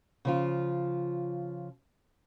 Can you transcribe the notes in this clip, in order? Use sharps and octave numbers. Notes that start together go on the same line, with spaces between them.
C#3 F3 F4